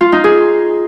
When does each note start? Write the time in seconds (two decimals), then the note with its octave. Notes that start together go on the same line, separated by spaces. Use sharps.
0.01 F4
0.12 D#4
0.24 G#4